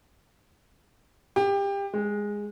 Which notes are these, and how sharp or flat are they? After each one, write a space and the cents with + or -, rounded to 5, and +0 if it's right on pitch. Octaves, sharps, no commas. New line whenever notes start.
G4 +25
G#3 -10